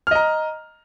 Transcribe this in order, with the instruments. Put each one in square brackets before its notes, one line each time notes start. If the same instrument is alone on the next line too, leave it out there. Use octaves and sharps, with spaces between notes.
[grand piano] F6
D#5
A#5